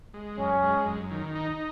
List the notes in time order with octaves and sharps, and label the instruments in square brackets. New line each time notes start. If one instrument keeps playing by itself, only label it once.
[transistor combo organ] G#3
[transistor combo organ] F#2 [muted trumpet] C#4
[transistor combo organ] G#3
F#2
D#3
D#4